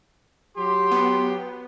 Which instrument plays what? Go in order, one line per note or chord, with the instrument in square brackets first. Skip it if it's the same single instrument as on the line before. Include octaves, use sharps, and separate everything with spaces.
[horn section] F#3 G4 [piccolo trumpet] C6
[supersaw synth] B3